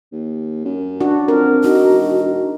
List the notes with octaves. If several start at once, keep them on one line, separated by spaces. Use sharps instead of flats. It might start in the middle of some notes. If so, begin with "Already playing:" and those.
D#2
F#2
D4 F#4
F2 A#4
D#4 F#4
E1